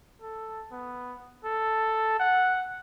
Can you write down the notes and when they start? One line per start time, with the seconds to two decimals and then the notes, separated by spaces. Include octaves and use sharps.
0.21 A4
0.71 B3
1.44 A4
2.20 F#5